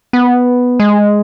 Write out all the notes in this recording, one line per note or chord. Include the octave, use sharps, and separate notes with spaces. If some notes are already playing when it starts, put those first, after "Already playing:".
B3
G#3